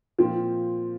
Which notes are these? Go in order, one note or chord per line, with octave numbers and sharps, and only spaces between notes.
A#2 F3 C4